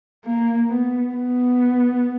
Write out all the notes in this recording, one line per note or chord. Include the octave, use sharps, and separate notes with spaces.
A#3
B3
B3